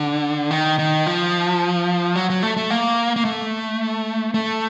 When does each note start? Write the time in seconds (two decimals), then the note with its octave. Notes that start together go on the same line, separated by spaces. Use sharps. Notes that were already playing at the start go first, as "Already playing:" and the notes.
Already playing: D3
0.51 D#3
0.79 D#3
1.07 F3
2.16 F#3
2.30 F#3
2.43 A3
2.57 A3
2.70 A#3
3.16 A#3
3.25 A3
4.34 A3